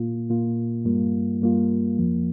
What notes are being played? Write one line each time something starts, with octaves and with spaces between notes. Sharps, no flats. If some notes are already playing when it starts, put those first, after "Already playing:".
Already playing: A#2 A#3 F4
A#2 A#3 F4
G2 G3 A#3 F4
G2 G3 A#3 F4
F2 F3 A#3